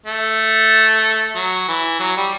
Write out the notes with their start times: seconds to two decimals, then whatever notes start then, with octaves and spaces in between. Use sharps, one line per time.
0.06 A3
1.35 F#3
1.68 E3
2.00 F#3
2.17 G3